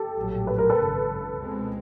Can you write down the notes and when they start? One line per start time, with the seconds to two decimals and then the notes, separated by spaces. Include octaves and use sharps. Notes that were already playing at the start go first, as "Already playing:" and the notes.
Already playing: G4 A4
0.16 A#1 A2 F#3 A3
0.47 B4
0.58 A#4
0.70 A4 B4
0.78 G#1 F#2 C#3
1.40 C#2 B2 G#3 C4